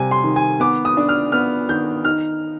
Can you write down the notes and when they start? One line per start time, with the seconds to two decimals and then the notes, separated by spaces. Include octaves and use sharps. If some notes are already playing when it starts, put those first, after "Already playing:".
Already playing: C3 G3 G#5
0.11 C6
0.24 D#3
0.36 G#5
0.60 B3 D6
0.85 D#6
0.97 D4
1.09 F6
1.32 B3 F6
1.69 D#3 G6
2.05 D#4 F6